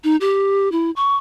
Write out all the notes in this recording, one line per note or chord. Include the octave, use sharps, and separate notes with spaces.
D#4
G4
E4
C#6